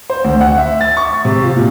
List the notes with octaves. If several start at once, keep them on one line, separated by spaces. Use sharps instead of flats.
C5
D2
F#5
E5
A6
C#6
C3
F4
A#2